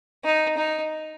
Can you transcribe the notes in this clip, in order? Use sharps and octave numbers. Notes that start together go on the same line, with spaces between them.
D#4
D#4